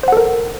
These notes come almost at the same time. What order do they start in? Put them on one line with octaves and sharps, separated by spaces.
C5 F#5 A4 A#4